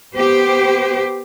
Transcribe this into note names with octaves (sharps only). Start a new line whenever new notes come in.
B3 G4 C5